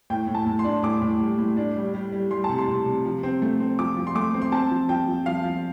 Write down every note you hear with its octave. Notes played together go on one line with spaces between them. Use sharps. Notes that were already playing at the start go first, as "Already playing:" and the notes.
A2 G5
A2
A5
A2
C6
D4
A2 D6
A2
G3
A2
D4
G3
G3
G3
G3 C6
A5
C3
C6
C3
C3
F3
C4
A3
C4
F3 D6
F3
C6
A3 D6
C4
C6
C4 A5
F3
F3 G5
F3
F3 F5
F3